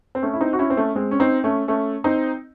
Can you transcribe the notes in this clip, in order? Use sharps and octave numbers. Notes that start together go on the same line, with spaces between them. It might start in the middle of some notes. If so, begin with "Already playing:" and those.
C4
A3 C#4
E4
C4 D#4
F#4
C#4 E4
C4
A3 C#4
G#3 C4
C#4
C4 D#4
A3 C#4
A3 C#4
C4 D#4